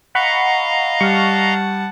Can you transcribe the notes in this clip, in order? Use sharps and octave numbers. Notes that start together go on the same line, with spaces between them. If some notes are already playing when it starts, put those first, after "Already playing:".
D#5 F5 F#5 A#5 B5 C#6
G3 F#5 A5 C#6 F6